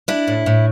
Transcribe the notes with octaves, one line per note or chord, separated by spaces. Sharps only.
D4 E4
A2
A2